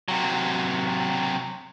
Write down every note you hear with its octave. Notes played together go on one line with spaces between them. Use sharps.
C3 F#3